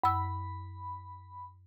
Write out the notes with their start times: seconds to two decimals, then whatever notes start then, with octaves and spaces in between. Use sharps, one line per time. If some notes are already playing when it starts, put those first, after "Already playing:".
0.03 F#2 B5 E6